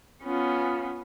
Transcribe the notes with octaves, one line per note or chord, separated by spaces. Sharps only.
B3 C#4 F4